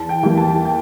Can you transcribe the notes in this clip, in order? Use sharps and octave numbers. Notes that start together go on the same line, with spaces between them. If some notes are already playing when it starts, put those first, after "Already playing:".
Already playing: E2 A5
G5
E3 G3 A#3
A5
G5